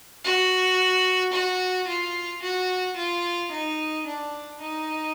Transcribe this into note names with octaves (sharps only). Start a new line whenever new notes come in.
F#4
F#4
F4
F#4
F4
D#4
D4
D#4